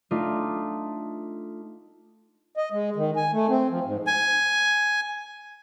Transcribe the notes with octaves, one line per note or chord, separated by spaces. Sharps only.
A3 D4 D#4 F4
D#5
G#3
D#3
G#5
A3
C4
F3
G#2
G#5